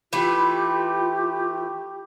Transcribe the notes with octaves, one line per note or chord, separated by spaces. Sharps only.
E3 A3 F4 G4 B4